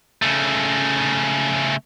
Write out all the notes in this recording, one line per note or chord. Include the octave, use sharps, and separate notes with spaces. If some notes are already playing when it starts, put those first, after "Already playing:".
C#3 A3